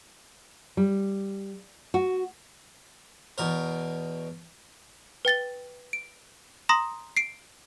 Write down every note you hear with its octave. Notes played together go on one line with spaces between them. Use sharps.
G3
F#4
E2 B2 A#4
B4 G5 A6 G7
D7
A#5 C6 D#6 A#6
C7 D7